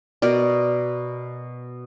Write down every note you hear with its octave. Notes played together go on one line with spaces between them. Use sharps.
B2 A#4 D5